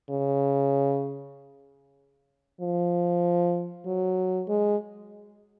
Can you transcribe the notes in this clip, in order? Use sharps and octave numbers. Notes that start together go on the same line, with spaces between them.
C#3
F3
F#3
G#3